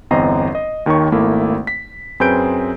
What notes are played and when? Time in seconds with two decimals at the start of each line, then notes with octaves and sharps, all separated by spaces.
0.11 G1 E2 C4 D#5 A#5 C7
0.55 D#5
0.86 D#2 D#3 D#4 C#5 C#6
1.12 G#1 A3 A#3 E4
1.67 B6
2.20 F#2 C4 G#4 B4 G6 D7